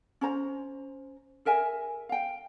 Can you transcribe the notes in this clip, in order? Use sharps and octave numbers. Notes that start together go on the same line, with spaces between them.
C#4 C5 A#5
G#4 A#4 E5 G#5
F5 G5